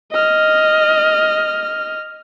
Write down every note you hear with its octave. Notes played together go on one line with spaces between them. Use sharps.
D#5 F6